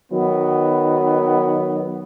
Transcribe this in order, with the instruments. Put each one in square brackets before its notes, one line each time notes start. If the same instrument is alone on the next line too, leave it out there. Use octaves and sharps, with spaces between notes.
[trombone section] D#3 F#3 B3